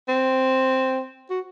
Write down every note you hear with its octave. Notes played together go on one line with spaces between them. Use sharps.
C4
F#4